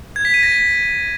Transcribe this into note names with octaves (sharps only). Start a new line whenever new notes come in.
G#6
B6
D#7
A#6
B6